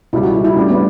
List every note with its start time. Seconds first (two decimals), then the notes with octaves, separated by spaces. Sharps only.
0.13 C#2 C#3 G3 E4
0.23 F#4
0.34 E4
0.45 E4
0.56 A2 G3 C#4 D4
0.70 B3